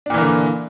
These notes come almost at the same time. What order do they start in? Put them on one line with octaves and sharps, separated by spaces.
D4 A#2 E3 A#3 D3